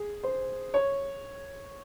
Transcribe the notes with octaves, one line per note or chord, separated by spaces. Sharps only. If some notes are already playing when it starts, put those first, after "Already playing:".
Already playing: G#4
C5
C#5